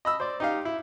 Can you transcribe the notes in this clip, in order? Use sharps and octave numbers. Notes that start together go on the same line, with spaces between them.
D#5 B5 E6
C5 D5
D#4 G4 F5
E4